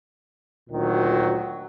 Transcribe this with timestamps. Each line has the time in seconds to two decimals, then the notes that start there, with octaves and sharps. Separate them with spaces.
0.70 D2 A#2 D#3 F#3